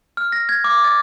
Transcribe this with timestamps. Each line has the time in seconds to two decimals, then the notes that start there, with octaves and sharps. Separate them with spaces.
0.17 F6
0.32 A#6
0.49 G#6
0.64 D6
0.84 A6